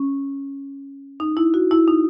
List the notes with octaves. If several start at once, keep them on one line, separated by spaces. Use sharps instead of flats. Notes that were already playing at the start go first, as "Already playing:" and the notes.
Already playing: C#4
D#4
E4
F#4
E4
D#4